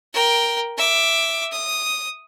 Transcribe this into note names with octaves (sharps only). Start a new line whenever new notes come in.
A#4 G5
E5 D6
D#6